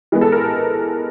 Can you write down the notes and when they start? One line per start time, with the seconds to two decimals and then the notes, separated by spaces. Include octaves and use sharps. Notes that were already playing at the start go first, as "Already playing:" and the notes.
0.12 E3 G#3 B3
0.21 A4
0.32 A#4